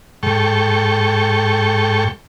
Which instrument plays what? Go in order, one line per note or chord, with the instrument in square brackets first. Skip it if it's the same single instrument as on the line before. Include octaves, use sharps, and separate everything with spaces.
[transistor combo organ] G#2 A4 G5 C#6